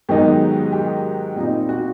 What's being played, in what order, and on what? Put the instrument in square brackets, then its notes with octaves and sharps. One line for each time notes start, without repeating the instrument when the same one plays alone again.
[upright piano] G#2 D#3 F#3 B3 D#4 G4
G4
A#2 G3 C4 D#4
F#4